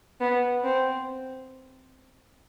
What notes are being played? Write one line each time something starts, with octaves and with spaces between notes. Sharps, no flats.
B3
C4